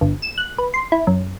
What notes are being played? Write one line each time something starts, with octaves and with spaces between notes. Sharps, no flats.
G1
E7
F#6
B4
C6
E4
F#2